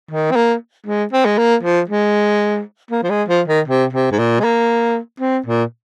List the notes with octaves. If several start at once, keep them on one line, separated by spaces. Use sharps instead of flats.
D#3
C4
A#3
G#3
C4
G#3
A#3
F3
G#3
A#3
F3
G#3
F3
D#3
C3
C3
G#2
A#2
G#3
A#3
C4
A#2